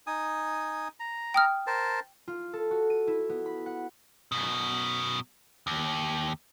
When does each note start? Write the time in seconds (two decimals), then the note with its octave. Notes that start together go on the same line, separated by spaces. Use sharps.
0.07 D#4 G#5 D#6
1.00 A#5
1.34 G5 D#6 F6
1.67 A#4 C5 A5
2.28 F4
2.53 A4
2.71 F#4
2.90 D#7
3.07 E4
3.29 B3
3.46 B5
3.66 F#5
4.32 F#2 B2
5.67 D#2